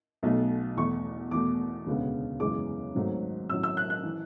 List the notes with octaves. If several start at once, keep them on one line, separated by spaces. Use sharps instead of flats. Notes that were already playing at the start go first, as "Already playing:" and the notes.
B1 B2 A3
E2 B2 A3 C#6
E2 B2 A3 D6
E1 D2 C#3 G#3 B3
F#2 C#3 E3 G#3 B3 D6
G#1 G#2 F#3 A3
A1 A2 F#3 E6
E6
F#6
F#6
E3